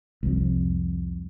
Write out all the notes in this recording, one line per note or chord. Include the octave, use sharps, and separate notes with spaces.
C2 F2